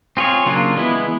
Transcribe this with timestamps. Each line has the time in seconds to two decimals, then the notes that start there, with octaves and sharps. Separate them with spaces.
0.17 C4 F4 G#4 C#5
0.46 C#3 F#3 A#3 D4 F4
0.77 E3 G#3 B3 E4